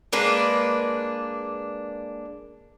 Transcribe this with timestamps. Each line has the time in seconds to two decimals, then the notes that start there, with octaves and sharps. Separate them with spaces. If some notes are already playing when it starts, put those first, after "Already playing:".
0.13 G#3 A#3 D4 B4